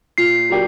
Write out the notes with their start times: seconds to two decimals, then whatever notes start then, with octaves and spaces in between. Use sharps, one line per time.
0.18 A#2 C7
0.49 F#3 A#3 D4 G4